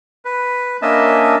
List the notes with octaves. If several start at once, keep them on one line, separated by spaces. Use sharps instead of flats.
B4
A#3 C#4 D4 D#5 E5 A5